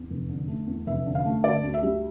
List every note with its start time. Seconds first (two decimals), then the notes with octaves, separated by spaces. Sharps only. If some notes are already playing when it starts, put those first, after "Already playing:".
Already playing: E2
0.10 F1
0.29 D3
0.48 A3
0.67 E2
0.86 F1 E5
1.06 D3
1.15 F5
1.25 A3
1.44 D3 D5
1.64 D2
1.74 E5
1.83 G3